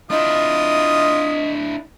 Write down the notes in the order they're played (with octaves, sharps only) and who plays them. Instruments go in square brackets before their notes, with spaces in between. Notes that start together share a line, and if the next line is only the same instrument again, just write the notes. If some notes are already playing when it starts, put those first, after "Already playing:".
[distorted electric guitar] D4 E4 [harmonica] F4 D#6 [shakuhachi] D#5